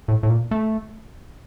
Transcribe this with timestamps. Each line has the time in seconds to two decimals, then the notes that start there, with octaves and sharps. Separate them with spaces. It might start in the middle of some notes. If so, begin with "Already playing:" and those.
0.08 A2
0.23 A2
0.30 A#2
0.51 A3